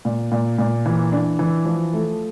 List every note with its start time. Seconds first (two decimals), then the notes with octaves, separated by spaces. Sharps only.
0.05 A#2
0.32 A#2
0.58 A#2
0.86 E3
1.12 D4
1.39 E3
1.65 F3
1.93 A3